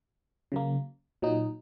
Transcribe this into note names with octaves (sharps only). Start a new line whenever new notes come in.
C#3 F#3 A#3
A#2 F#3 D#4